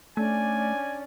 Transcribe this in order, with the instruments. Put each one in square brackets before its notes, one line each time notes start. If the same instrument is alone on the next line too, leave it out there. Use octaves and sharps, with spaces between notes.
[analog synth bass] A3 [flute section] C#4 D4 D5 [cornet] G#5